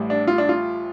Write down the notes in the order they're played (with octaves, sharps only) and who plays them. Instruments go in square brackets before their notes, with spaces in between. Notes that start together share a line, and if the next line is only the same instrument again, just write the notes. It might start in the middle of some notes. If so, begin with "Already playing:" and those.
Already playing: [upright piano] A1 A2 G3
D4
F4
D4
F4